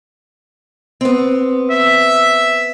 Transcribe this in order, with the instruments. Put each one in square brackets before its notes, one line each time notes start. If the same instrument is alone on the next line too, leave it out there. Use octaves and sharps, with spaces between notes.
[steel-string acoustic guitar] B3 C4
[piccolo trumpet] E5